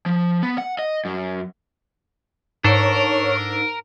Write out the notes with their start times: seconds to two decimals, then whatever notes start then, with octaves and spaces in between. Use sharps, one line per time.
0.06 F3
0.43 B3
0.58 F#5
0.79 D#5
1.05 F#2
2.64 G#2 D4 A4 A#4 C#5